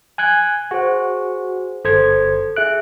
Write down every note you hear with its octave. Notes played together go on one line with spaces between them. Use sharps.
G#5 F#6 G#6
F#4 G#4 C5
G1 A4 C5 G#6
G#4 E5 F#6 D7